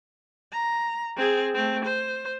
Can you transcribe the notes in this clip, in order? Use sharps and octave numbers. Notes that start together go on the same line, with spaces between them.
A#5
C4 G#4
A3 C4
C5